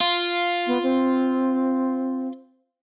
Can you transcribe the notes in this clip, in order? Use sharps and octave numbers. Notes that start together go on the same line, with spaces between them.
F4
B3
C4